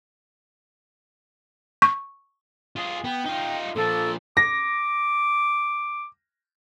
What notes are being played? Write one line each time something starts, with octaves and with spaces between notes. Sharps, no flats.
C#6
F4 G#4
B3 G5
D#4 F4
A#2 F3 A4
D6 A#6